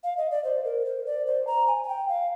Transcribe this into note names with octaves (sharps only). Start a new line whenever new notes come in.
F5
D#5
D5
C5
A#4
C5
D5
C5
A#5
G#5
G#5
G5
F5